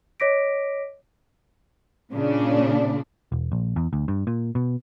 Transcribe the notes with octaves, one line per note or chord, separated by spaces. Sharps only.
C#5 D#5 D6 A#6 B6 D7
A#2 C#3 D4
E1
A#1
E2
D2
G2
A#2
B2